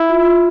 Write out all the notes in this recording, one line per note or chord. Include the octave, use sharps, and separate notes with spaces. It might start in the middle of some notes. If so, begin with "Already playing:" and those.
Already playing: E4
F4
F4